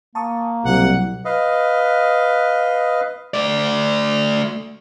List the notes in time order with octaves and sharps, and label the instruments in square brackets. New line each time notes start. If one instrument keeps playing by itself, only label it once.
[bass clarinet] A#3 [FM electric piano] A5 C#6 D#6
[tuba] C2 [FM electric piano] B2 F#3 [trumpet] F#5
[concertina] B4 D#5 F5
[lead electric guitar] A3 D5